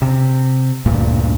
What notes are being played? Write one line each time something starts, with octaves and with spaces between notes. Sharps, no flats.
C3
D2 G2 A#2